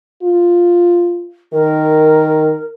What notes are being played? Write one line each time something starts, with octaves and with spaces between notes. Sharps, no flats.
F4
D#3 A#4